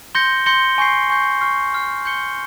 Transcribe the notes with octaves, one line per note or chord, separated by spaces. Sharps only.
C6 G6 A#6 C#7 G7
C6 G6 A#6 C#7 G7
G#5 C#6 G6 C7
G#5 C#6 G6 C7
C#6 F6 C7
C#6 F6 C7
C6 G6 C#7 G7